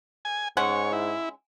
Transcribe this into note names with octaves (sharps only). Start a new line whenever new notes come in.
G#5
G#2 G#3 C#4 C#5 F#5
E4